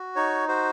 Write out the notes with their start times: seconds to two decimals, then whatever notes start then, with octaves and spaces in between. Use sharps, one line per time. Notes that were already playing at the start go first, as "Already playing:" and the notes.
Already playing: F#4
0.16 D#4 C#5
0.48 F#4 C5